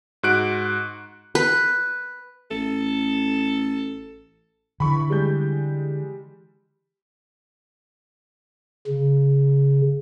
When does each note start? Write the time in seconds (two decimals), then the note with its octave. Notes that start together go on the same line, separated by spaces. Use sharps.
0.23 G#2 F#4 F#6 D7
1.35 B4
2.51 A1 A4
4.80 D3 E3 B5 C#6
5.10 G3 G#3 G6
8.87 C#3